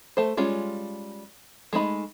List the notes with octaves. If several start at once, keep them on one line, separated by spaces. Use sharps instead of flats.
A3 C5
G3 G#3 C#4 F4
G#3 A3 D#4 B5